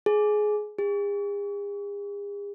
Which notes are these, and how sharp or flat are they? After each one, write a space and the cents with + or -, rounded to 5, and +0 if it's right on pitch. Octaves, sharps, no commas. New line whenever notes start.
G#4 +15
G#4 -40